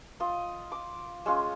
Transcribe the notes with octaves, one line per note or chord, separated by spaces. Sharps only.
F4 D#5
D6
G#3 C#4 F4